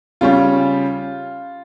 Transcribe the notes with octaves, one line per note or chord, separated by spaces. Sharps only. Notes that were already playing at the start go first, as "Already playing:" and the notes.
C#3 G3 C#4 F4